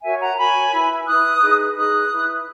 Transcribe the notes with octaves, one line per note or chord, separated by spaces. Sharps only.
F#4 A#4 C#5 E5 G#5
F#5 A#5
F#4 A#4 C#5 G#5 B5
E4 B4
E4 B4 D#6 F#6
D#4 G#4 B4
D#4 G#4 B4 D#6 F#6
E4 B4